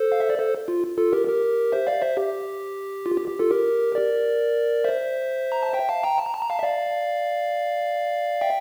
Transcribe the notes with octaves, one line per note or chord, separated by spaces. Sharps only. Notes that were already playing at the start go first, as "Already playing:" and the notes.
Already playing: A4 C5
F5
E5
D5
A4 C5
F4
F4 A4
G4 A#4
G4 A#4
C5 E5
D5 F5
C5 E5
G4
F4
G4
G4
F4 A4
G4 A#4
A#4 D5
C5 E5
A#5
A5
E5 G5
F5 A5
G5 A#5
A5
A#5
A5
A#5
F5 A5
E5
D5 F5
E5 G5